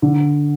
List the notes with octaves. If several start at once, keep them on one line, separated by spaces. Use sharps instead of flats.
D3